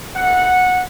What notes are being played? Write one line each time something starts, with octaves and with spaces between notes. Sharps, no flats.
C3 E3 A3 F#5